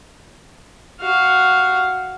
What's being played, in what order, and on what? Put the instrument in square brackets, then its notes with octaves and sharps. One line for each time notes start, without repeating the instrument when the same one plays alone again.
[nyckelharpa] F#4 F5